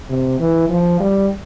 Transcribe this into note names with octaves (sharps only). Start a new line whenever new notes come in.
C3
E3
F3
G3